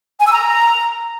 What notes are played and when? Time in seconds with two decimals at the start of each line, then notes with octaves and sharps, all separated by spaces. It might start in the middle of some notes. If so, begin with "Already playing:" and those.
0.19 G#5
0.26 E6
0.33 A#5